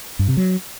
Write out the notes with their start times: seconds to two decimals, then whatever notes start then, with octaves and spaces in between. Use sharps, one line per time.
0.19 G2
0.28 C3
0.37 F#3